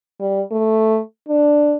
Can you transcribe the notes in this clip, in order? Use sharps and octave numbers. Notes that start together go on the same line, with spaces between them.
G3
A3
D4